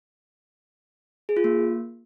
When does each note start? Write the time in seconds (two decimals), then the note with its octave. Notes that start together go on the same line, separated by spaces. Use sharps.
1.29 G#4
1.37 F4
1.44 A#3